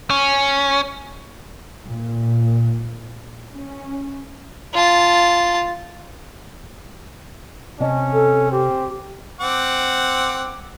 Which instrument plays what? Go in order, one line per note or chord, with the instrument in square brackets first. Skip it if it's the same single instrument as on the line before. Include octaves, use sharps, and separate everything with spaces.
[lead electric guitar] C#4
[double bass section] A#2
C#4
[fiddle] F4 A5
[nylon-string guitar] C3 D#5 A5 [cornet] C#4
[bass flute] A4
[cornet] C4 [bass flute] G4
[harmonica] C4 F#5 D6